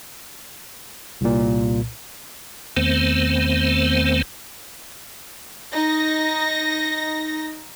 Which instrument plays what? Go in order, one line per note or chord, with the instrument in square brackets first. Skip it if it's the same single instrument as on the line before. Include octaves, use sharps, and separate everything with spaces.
[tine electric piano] C2 A#2
[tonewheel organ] E2 D#3 A3 B3 C4 C5
[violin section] D#4 A#6